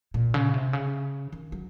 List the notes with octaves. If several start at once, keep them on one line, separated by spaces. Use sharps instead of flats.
A#2
C#3
C3
C#3
D#3
F#3